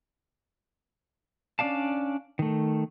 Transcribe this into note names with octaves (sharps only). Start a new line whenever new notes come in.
C#4 D4 D5 F5 A5
D#3 A3